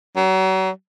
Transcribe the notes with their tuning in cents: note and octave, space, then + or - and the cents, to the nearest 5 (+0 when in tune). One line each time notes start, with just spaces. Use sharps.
F#3 +35